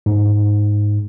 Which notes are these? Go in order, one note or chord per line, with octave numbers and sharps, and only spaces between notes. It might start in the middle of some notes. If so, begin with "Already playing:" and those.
G#2